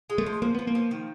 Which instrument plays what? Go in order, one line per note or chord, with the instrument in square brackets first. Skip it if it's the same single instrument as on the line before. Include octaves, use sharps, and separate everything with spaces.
[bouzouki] G#3
[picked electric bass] A3
[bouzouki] F3
[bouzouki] F3 [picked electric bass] A#3
[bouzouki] F3 [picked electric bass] B3
[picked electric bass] A#3
[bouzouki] F3
D#3